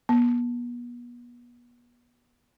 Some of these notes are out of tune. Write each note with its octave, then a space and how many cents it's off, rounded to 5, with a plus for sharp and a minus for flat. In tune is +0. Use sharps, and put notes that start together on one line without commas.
B3 -35